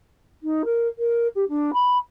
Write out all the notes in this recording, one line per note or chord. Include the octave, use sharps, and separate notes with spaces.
D#4
A#4
A#4
G4
D4
B5